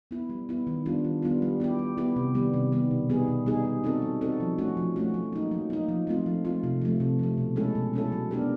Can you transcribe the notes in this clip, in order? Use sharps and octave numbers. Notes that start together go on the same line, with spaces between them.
B3 E4
G3
B3 E4
D#3
G3 B3 D4 F4
D#3
G3 B3 D4 F4
G3
B3 E4 G4
G3
B3 E4 G4
C3
D#3 G3 B3
C3
D#3 G3 B3
B2
G3 B3 D#4 G#4
B2
G3 B3 D#4 G#4
G3
C4 D#4 F#4 A4
G3
C4 D#4 F#4 A4
F3
A3 C#4 F#4
F3
A3 C#4 F#4
F#3
A#3 D#4
F#3
A#3 D#4
F3
A3 C4 F4
F3
A3 C4 F4
C3
F3 A3
C3
F3 A3
B2
G#3 C#4 E4 A4
B2
G#3 C#4 E4 A4
F#3
B3 D4 G4 A#4